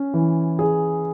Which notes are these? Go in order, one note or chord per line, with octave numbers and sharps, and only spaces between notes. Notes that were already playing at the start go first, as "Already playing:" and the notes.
Already playing: C#4
E3
G#4